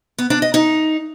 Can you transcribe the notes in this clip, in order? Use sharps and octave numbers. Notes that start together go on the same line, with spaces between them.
B3
D4
D#5
D#4